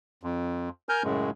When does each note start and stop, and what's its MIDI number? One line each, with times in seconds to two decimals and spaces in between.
0.23 0.69 41
0.89 1.03 70
0.89 1.03 80
0.89 1.03 89
0.89 1.03 91
1.04 1.30 42
1.04 1.30 45
1.04 1.30 49
1.04 1.30 56